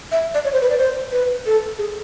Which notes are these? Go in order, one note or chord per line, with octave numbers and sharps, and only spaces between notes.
E5
D5
C#5
C5
B4
D5
C5
B4
A4
G#4